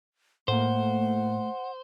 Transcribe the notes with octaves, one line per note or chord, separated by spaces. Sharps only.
A2 A3 A#3 C5 F#5